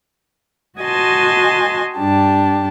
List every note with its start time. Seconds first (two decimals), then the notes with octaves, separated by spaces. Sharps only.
0.80 F#4 D#5 G#5 A5 C6
1.97 G2 D4 G4 A5